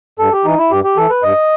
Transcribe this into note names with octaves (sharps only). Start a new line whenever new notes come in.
G2 A4
G4
E3 D#4
E4
G2 G4
G4
E3 A4
B4
G2 D#5